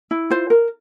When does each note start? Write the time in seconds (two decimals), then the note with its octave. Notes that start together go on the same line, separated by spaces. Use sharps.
0.11 E4
0.30 F4 C5
0.50 A#4